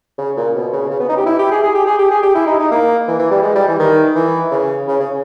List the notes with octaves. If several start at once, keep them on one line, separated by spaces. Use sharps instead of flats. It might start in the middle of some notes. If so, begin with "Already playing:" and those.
C#3
A#2
B2
C#3
C#3
B3
D#4
G4
E4
G4
G#4
G#4
G4
G#4
G4
G#4
G4
E4
D#4
D#4
A#3
E3
E3
G3
G#3
G3
E3
D#3
E3
C#3
C#3
C#3